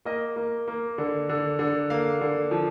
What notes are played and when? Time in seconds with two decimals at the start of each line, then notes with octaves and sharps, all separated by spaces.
0.05 A#3 D#5
0.36 A#3
0.68 A#3
0.98 D3
1.29 D3
1.59 D3
1.90 A#3 F5
2.21 D3
2.51 F3